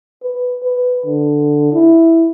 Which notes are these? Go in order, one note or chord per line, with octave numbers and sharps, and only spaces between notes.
B4
B4
D3
E4